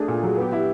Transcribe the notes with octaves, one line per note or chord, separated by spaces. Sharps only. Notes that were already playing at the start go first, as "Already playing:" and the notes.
Already playing: A3 D4 G#4
A#2
F#3
B3 G4
E4